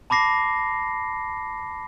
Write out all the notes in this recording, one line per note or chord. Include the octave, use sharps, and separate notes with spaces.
A5 B5 D6 A#6 C7